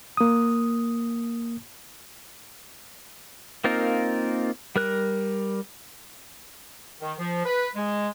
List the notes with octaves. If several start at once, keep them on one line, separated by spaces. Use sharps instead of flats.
A#3 D#6
A#3 C4 D#4 F4 A#4
G3 A#4 F#6
D#3
F3
B4
G#3